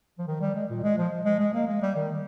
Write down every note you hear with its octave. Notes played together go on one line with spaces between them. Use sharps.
F3
D#3
G3
G#3
A#2
G#3
F3
G#3
G#3
A#3
G#3
G3
D#3